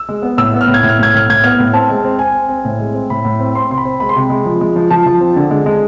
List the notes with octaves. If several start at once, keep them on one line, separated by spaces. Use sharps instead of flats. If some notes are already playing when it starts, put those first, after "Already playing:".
Already playing: E6
G#3
B3
A2 E6
B3
F6
A2
G#6
A2
F6
A2 G#6
A2 F6
A2 G#6
B3 F6
A2
C4 A5
G#3
C4
C4 G#5
C4
C4
A2
G#3
C4
A2 B5
A2
C4
C4 C6
C3 C6
B5
C4
G#3 B5
C6
C3 B5
G#3
F3
G#3
F3
F3 A5
F3
C4
D3
G#3
G#3